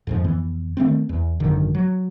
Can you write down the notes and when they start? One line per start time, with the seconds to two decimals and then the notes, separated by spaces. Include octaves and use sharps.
0.07 F2 G#2 F3
0.24 F2 E3 B3
0.77 D#3 A3 B3 C4
1.09 E2
1.40 G#1 F#2 D3 D#3
1.75 F#3